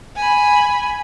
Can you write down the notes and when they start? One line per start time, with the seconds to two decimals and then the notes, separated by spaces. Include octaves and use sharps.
0.16 G#5 B5